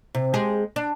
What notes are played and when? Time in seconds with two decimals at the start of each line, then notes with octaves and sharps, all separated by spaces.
0.15 C3
0.34 G#3 G4 G#4
0.76 D4